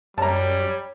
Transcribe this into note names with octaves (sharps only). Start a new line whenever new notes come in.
F#2 G3 C#5 A5 A#5